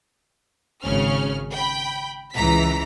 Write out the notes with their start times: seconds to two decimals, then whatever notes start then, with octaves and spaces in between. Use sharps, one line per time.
0.83 G#1 C#3 C#4 F6
1.53 G5 B5
2.34 C#2 E3 A#5 B6